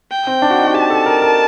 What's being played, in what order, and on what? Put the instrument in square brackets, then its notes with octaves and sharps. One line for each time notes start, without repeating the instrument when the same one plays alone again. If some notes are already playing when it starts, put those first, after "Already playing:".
[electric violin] G5
[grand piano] C4
D4
F#4
D#4
F#4
[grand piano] G4 [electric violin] A5
[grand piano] A4
A#4
A#4